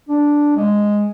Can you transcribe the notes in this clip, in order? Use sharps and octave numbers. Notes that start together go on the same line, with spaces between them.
D4
G#3